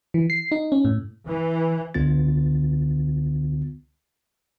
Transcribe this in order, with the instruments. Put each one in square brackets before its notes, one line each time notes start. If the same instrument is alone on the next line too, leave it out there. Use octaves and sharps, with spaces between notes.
[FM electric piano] E3
C7
D#4
C#4
A2
[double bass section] E3
[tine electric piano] C#2 D3 B3 F4 A6